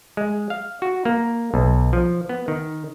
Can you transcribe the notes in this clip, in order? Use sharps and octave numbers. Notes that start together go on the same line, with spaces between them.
G#3
F5
F#4
A#3
B1
F3
B3
D#3